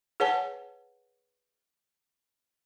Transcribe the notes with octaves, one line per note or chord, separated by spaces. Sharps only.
G#4 B4 C#5 F#5 G#5 A5